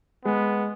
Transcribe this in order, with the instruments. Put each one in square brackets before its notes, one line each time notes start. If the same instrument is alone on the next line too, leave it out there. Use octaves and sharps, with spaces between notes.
[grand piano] G#3 [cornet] B3